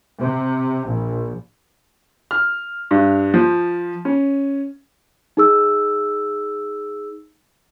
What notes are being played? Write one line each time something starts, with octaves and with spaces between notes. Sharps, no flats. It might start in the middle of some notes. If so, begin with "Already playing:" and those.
C3
A#1
F6
G2
F3
C#4
D#4 G#4 E6